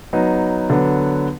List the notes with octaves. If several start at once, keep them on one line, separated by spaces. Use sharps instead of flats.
F#3 B3 D#4
D3 F#3 B3